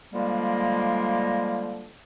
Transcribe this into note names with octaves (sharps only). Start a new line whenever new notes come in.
D3 F3 G3 G#3 A#3